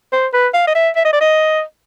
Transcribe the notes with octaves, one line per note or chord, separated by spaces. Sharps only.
C5
B4
F5
D#5
E5
E5
D#5
D5
D#5